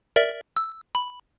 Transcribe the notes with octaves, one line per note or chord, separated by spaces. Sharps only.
A#4 D5 E5
E6
B5